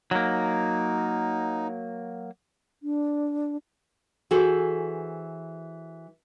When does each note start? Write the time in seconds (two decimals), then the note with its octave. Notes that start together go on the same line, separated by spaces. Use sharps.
0.11 F#3 A#3 D#4
2.83 D4
4.31 E3 F#4 G#4 A4 C5